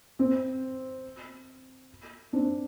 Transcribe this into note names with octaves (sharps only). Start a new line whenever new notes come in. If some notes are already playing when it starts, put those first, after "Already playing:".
C4
C4 D4